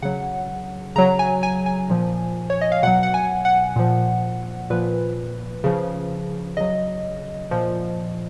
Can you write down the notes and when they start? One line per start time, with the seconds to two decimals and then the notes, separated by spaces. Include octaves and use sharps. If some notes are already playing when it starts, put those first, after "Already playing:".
0.02 C#3 F#3 F#5
0.96 C#3 F#3 A#5
1.19 G#5
1.43 G#5
1.66 G#5
1.90 A#2 F3
2.50 C#5
2.61 D#5
2.72 F5
2.83 B2 F#3 F#5
3.03 F#5
3.14 G#5
3.45 F#5
3.76 A#2 F3
4.70 A#2 F3 B4
5.64 C#3 F3
6.57 C#3 F#3 D#5
7.51 A#2 F3